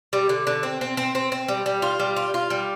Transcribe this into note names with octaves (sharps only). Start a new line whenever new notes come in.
G3
D3
D3
C4
C4
C4
C4
C4
G3
G3
F4
G3
F4
F4
G3